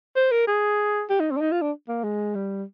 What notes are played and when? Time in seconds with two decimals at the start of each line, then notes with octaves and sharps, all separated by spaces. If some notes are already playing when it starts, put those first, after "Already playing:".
0.16 C5
0.32 A#4
0.47 G#4
1.10 G4
1.20 D#4
1.31 C4
1.37 D4
1.41 D#4
1.52 F4
1.62 D4
1.88 A#3
2.04 G#3
2.35 G3